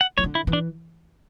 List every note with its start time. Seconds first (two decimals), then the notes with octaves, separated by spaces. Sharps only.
0.01 F#5
0.18 E3 C#5
0.24 D3
0.35 E4
0.47 E3
0.53 D4